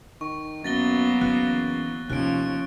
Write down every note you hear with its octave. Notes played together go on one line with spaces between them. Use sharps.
D#3 C#6
F#2 F#3 A#3 B3 A6 A#6 G7
F#1 E3 C4 F#6
D#2 C3 F3 C#4 F#6 D7